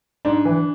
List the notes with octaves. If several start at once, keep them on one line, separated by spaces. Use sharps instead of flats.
G#2 D4
E3